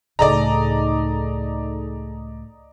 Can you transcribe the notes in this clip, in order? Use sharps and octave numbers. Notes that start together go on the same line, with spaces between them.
C#2 A2 D#4 G#4 A4 D5 D#5 A#5